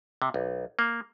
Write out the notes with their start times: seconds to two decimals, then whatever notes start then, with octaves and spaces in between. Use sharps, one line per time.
0.22 C3
0.34 B1
0.79 A#3